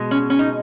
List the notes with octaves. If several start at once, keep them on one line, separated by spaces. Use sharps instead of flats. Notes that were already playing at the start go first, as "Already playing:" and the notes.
Already playing: B2 G#3
C#4
C#4
D#4